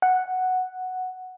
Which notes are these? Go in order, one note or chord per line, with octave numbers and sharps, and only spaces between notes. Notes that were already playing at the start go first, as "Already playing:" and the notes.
F#5